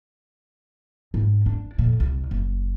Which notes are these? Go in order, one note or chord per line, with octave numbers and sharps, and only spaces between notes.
G#2
D4
F2 A#2
C2
F#1